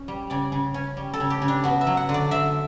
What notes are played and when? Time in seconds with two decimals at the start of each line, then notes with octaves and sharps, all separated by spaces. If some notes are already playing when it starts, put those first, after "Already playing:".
Already playing: C#4
0.08 G3
0.30 C#3 D5
0.52 C#3
0.74 C#4
0.97 G3
1.14 A4
1.20 C#3
1.30 G4
1.42 C#3
1.48 D4
1.64 B3 F#4
1.81 E5
1.87 F#3
1.97 F#5
2.09 D3
2.14 D5
2.31 D3 E5